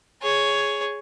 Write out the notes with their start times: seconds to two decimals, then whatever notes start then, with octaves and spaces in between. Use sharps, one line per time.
0.22 G#4 C#5